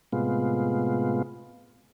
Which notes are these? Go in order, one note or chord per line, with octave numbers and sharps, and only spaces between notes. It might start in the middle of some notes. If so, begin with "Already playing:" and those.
A2 C3 G#3 B3 F4